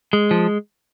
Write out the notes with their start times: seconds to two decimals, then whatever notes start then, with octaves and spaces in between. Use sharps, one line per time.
0.13 G#3
0.31 F3